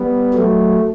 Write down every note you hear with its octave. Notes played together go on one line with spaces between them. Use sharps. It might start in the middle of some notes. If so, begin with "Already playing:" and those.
Already playing: G3 B3
F#3 A3